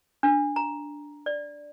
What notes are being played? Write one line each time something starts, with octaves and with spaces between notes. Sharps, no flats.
D4
A#5
D5